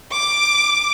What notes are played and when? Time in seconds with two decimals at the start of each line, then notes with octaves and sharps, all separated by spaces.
0.11 D6